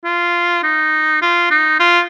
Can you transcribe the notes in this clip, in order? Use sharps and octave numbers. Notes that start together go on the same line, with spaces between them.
F4
D#4
F4
D#4
F4